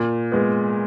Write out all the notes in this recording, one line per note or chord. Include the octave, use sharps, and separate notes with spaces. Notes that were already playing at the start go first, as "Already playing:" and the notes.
Already playing: A#2
G#3 B3